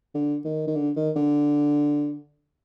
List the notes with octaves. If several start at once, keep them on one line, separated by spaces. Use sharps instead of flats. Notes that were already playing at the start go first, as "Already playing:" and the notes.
D3
D#3
D#3
D3
D#3
D3